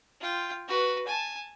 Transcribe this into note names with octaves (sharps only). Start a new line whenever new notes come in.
F4 G5
F#4 B4
G#5 A5